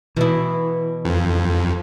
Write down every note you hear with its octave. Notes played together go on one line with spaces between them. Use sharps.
B2 E3 E4
F2